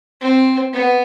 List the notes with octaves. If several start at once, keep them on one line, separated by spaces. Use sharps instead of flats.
C4
B3